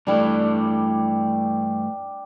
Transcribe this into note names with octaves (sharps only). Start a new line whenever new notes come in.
G2 E3 G3 A3 D4